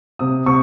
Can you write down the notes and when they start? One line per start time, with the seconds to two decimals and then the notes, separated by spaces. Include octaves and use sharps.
0.19 C3 D#6
0.46 C3 C#6